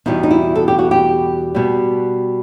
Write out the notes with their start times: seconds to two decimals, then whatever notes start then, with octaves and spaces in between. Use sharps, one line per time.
0.06 E2 B2 G3 D#4
0.23 D#4
0.31 E4
0.55 A4
0.68 G4
0.79 F#4
0.91 G4
1.55 B2 G3